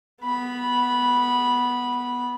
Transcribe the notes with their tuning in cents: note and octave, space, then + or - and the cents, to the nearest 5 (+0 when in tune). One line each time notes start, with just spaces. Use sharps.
B3 +0 B5 -15